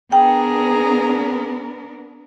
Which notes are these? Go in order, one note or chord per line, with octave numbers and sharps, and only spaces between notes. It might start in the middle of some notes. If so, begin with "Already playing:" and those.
B3 D4 G#4 A#4 G5 A#5